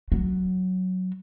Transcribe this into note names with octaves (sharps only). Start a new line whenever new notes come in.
F#3